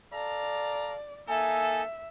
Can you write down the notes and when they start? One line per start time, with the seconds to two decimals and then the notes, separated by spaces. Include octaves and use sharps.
0.13 A4 D5 F5 A#5
1.28 A#3 D#4 A4 E5 G#5